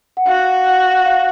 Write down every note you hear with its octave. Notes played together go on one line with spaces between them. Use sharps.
F#5
F#4 F5
F#5
F5